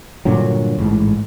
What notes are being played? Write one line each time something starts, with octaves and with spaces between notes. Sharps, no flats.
G2 A#2 D3 F#3
A1 G#2